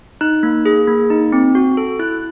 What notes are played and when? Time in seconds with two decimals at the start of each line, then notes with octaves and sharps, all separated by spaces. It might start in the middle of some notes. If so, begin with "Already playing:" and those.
0.21 D#4 F#6
0.43 A#3
0.65 G#4
0.87 A#3
1.10 D#4
1.33 C4
1.55 F#4
1.77 A4
1.99 E4 F#6